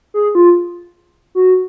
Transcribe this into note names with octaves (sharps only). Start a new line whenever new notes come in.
G#4
F4
F#4